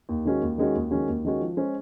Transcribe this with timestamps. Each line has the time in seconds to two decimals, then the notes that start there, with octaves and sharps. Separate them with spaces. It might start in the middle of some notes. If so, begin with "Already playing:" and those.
0.09 D#2
0.25 D#3 G#3 C#4 F#4
0.42 D#2
0.58 D#3 G#3 C#4 F#4
0.75 D#2
0.91 D#3 G#3 C#4 F#4
1.08 D#2
1.25 D#3 G#3 C#4 F#4
1.40 F3
1.57 G#3 C#4 G#4 C5